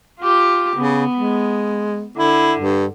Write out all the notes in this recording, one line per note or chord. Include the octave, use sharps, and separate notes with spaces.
F4 G4
C#3 B3
G#3
D3 E4
G2